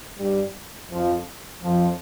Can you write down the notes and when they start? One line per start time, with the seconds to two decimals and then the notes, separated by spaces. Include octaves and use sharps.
0.18 G2 G3
0.91 F2 F3
1.63 F2 F3